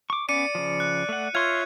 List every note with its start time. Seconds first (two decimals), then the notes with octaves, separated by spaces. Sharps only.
0.10 C#6 D6
0.29 B3 C#4 D5 D6 C#7 D#7
0.55 C#3 F3
0.80 F#6
1.09 A3 F#5
1.35 F4 C#5 E5 F5 C6 F6 G#6